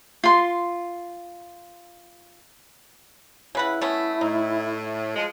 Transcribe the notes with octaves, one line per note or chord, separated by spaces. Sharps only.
F4 C6
C#3 E4 B4 F#5
A3 B3 C#4
A2 D#4
F3 G#3